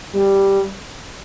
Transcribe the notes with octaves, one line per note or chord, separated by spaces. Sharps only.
G3